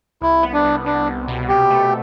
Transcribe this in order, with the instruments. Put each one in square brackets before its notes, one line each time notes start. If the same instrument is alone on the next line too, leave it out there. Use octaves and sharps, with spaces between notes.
[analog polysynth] C2 [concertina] E4
[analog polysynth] B3
[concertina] D4
[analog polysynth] C2
[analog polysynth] C2 [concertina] D4
[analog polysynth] C2
B2
[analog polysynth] C3 [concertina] G4
[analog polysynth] A3